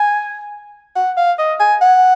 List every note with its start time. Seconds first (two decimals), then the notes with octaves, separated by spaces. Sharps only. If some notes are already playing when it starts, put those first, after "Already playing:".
Already playing: G#5
0.95 F#5
1.17 F5
1.39 D#5
1.60 G#5
1.81 F#5